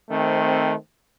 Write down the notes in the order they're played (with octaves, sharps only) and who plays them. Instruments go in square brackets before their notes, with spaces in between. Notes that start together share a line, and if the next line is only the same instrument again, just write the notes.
[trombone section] D#3 A3 C4